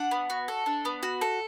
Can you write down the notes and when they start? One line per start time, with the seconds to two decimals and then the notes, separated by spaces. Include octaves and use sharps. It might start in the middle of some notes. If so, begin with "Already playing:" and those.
Already playing: D4 F#5
0.11 B3
0.30 F#4
0.48 A4
0.66 D4
0.85 B3
1.03 F#4
1.21 A4